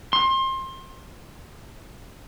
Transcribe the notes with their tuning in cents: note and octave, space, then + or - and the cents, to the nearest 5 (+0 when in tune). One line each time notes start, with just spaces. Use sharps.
C6 +25